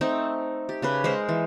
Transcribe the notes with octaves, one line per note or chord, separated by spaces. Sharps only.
A3 C4 D#4 G5
G4
C#3 C#4 B4
G#3 A#4 C5
E3